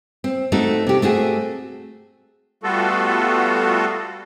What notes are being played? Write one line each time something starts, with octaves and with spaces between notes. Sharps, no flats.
C4
A3 C4 D#4 F#4 A4
C3 G4
A3 C4 F#4 G#4
G3 A3 B3 F4 F#4 A4